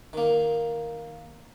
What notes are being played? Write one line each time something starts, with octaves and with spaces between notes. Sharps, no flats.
D#3 A#3